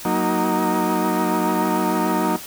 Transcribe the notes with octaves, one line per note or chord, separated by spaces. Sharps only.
F#3 A#3 D#4